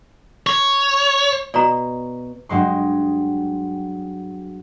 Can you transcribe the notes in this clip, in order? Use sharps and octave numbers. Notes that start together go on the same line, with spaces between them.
C#5
B2 D5 A#5
G2 F#3 G#3 C6